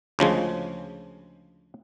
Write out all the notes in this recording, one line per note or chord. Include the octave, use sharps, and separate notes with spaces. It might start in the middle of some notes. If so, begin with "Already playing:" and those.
D2 C#3 F3 G#3